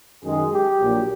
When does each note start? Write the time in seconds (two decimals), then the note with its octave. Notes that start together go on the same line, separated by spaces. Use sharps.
0.24 F#2 D#3 G#3 G#4
0.52 G4
0.79 A#1 A#2 F#3